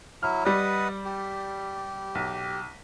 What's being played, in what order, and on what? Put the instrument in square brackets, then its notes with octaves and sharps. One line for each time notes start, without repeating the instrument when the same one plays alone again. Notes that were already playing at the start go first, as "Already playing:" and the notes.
[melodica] F#3 E4 [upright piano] F6
[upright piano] G3 D5 [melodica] B4 D#5 F#5
[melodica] G4
[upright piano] B1